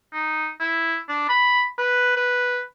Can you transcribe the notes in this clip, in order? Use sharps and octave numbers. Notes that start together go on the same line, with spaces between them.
D#4
E4
D4
B5
B4
B4